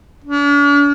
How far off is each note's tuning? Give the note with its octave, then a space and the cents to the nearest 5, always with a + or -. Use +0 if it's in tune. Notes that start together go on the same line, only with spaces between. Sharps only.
D4 -45